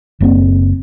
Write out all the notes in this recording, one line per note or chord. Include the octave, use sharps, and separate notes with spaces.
F#1 A#3 C4